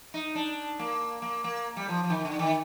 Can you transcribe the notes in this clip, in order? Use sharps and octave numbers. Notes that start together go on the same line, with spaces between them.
D#4
D4
A#3
A#3
A#3
G3
F3
F3
D#3
D3
D#3